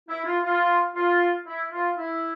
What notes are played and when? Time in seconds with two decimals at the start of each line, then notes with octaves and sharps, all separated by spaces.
0.09 E4
0.26 F4
0.43 F4
0.95 F4
1.46 E4
1.72 F4
1.97 E4